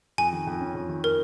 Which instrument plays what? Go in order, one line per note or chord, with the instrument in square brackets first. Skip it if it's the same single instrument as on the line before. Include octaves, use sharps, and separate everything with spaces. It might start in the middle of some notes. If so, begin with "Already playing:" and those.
[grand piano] F2 [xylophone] G#5
[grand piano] D#3
F2
C#4
F2
D#3
[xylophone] A#4